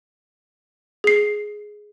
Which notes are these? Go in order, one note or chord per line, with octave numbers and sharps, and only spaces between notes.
G#4 C7